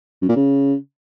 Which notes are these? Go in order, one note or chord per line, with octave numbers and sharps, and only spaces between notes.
F#2
A#2
C#3